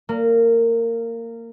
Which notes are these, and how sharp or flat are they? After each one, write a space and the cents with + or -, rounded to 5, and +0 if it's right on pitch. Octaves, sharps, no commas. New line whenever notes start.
A#3 -20